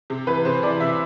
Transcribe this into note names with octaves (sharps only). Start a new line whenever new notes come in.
C3
E3 B4
C3 C5
E3 D5
C3 E5